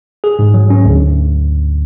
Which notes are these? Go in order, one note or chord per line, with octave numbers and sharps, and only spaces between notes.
G#4
G#2
F#3
C#4
D2